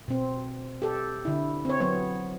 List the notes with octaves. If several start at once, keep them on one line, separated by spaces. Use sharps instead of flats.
B2 C4
G4 A4
D3 E4
C4 C#5
F#3 B3 C#5